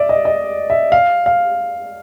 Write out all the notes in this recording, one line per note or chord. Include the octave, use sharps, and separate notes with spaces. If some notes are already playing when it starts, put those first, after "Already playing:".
Already playing: D5 E5
D#5
D#5
E5
F5
F5